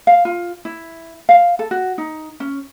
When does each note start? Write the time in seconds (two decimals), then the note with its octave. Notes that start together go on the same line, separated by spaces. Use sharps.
0.07 F5
0.25 F4
0.65 E4
1.29 F5
1.59 A4
1.71 F#4
1.98 D#4
2.40 C#4